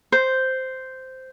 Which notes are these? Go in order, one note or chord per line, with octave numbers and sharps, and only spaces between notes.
C5